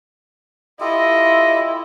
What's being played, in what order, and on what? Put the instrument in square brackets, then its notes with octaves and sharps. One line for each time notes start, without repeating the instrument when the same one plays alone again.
[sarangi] E4 [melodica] F4 G4 A4 [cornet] D#5